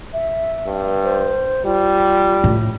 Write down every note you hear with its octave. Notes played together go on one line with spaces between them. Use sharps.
E5
G2
C5
G3 F4
A2